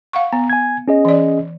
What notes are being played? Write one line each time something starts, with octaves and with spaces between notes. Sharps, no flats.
F5 F#5 C#6
B3 A#5
G#5 G#6
C#4 G#4 D#5
E3 D5